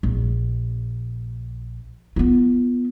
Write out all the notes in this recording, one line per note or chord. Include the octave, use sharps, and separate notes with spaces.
A#1
B3 F4